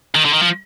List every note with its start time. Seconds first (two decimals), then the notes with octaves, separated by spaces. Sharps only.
0.15 D#3
0.25 D3
0.33 D#3
0.42 F3